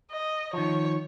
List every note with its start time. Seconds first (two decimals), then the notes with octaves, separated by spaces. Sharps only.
0.11 D#5
0.53 D#3 F3 C#5